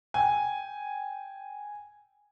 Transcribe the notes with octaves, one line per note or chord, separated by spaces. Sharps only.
G5 G#5